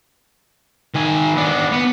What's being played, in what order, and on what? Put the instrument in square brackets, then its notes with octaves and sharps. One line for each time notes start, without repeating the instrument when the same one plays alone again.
[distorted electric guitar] D#3 G#5
B3 D4
B3